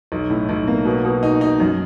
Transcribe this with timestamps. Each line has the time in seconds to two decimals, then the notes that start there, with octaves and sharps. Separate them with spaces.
0.12 B1
0.30 A2
0.49 B1
0.67 A#3
0.85 B2
1.05 B2
1.23 D#4
1.41 D#4
1.60 F#2